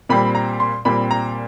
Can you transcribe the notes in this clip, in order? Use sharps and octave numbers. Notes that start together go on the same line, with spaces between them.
A#2 G3 C4 B5
A#5
C6
A#2 G3 C4 B5
A#5